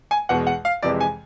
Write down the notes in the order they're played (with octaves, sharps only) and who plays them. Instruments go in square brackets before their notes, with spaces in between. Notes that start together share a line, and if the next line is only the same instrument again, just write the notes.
[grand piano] G#5
E2 B2 G#3 F#5
F#5
F5
F2 C3 E3 G#3 D5
G#5